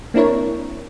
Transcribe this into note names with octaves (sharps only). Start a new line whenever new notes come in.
A#3 C4 D4 E4 A#4 C#5